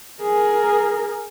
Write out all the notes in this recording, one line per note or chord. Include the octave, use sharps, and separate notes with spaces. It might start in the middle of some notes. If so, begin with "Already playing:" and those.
G#4 A#4